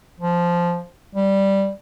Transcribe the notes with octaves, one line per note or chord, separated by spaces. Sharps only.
F3
G3